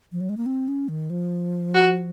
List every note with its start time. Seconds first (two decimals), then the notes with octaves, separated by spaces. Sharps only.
0.12 F3
0.20 F#3
0.29 G#3
0.37 A#3
0.46 C4
0.68 C#4
0.88 D#3
1.10 F3
1.74 F#4